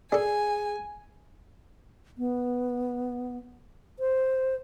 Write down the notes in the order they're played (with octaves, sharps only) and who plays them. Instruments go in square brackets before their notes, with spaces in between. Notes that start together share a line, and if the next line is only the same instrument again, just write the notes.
[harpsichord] D4 A4 [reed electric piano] G#4 [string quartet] G#5
[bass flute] B3
C5